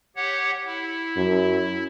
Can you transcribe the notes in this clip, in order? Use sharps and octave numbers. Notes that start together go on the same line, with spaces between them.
G4 C#5 F#5
E4
F#2